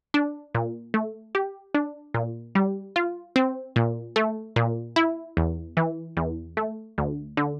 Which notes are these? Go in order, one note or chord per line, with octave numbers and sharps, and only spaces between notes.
D4
A#2
A3
G4
D4
A#2
G3
F4
C4
A#2
A3
A#2
E4
E2
E3
E2
A3
D2
D3